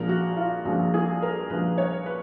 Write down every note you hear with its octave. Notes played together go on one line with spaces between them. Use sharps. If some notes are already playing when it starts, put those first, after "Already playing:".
Already playing: A#1 A#2 F3 G#3 A#4
F#4
F4
A#1 A#2 F3 G#3 F#4
G#4
A#4
A#1 A#2 F3 G#3 B4
C#5
B4